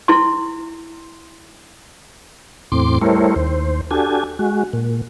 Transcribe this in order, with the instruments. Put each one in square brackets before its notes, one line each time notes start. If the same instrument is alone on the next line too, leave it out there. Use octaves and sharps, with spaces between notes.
[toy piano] E4 C6
[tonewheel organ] E2 A2 C4 C6 D6
G3 A3 E4 A#4 C5 C#5
D#2 C5
D4 F#4 G4 A4 G#5
G#3 F#4
A#2